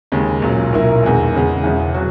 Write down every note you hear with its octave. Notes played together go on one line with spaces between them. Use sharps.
D#2 C#3 G#3
B1 A#2 F#3 C#4
B1 A#2 A#3 E4 A#4
E2 D#3 G#3
E2 C#3 G#3
E1 E2 C#3 E3
B2 F#3 B3 F#4